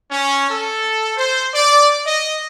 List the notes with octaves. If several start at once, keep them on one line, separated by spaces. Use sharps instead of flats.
C#4
A4
C5
D5
D#5